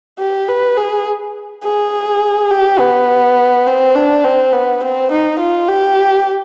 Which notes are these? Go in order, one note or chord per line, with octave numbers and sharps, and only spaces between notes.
G4
B4
G#4
G#4
G4
B3
C4
D4
C4
B3
C4
D#4
F4
G4